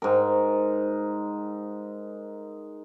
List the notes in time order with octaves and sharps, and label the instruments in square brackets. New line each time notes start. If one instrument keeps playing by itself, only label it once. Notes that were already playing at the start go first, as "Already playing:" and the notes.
[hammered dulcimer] G#2 A#4